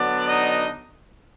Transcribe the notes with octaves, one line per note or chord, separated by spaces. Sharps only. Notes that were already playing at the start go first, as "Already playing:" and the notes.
Already playing: D3 F#3 B3 D4 D5
D#4 D#5